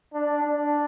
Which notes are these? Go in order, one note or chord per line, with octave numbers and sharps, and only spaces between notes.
D4
D4